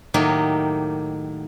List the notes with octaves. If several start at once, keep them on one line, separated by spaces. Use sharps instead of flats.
A2 D#3 F#3 A#3 G4 D#5